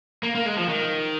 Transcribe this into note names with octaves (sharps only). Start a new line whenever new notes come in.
A#3
A#3
G#3
F3
D#3